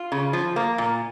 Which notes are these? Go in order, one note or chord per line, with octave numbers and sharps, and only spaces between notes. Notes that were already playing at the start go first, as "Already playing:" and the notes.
Already playing: F4
C#3
F3
A#3
A#2